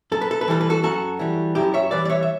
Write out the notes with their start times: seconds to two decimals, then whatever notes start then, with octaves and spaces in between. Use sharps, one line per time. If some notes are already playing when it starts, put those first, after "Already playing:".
0.12 F#2 A4
0.21 B4
0.31 A4
0.41 B4
0.48 E3 G3 A4
0.61 B4
0.70 F#4 A4
0.83 F#2 F#4 A4
1.19 E3 G3
1.55 F#2 E4 G4
1.74 C#5 E5
1.91 E3 G3 B4 D5
2.05 D5
2.10 C#5 E5
2.23 E5